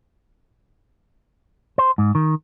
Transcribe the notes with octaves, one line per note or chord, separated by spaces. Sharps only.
C5
G#2
D#3